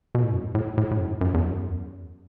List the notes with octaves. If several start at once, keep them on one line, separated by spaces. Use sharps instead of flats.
B2
A2
F#2
A2
A2
A2
F#2
F#2
E2
F#2